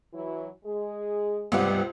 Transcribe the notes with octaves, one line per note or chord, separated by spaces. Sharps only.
E3 F#3 E4
G#3 G#4
C#2 G2 C3 G3 B3 F#5